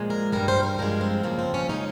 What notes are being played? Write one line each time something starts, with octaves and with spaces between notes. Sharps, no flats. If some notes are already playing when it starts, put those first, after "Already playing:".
Already playing: A#2 F3 G#3
A#4
G2 G3 A#4
C5
A#4
G2 F3 G#3 A#4
C4
F2 C#3 F3 A#3
C4
C#4
C#3 G#3 D#4